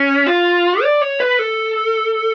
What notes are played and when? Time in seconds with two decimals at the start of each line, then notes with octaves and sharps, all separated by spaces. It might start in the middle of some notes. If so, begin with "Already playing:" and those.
Already playing: C#4
0.26 F4
0.82 D5
1.02 C#5
1.20 B4
1.39 A4